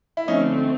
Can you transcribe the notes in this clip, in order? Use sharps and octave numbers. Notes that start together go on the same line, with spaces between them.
E4
D3 F3 A3 C4 C#4 D#4